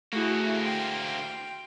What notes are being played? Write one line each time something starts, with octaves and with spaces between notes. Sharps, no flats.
D2 A3 A#3 E4 F#4 G#4
G5 C6 F6